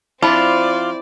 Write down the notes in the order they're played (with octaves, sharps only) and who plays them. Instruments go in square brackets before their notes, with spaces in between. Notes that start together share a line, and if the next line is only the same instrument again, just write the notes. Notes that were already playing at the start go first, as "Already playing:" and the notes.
[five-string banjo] F3 D4 [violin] C4 D5 [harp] E4 B5 [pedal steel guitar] F4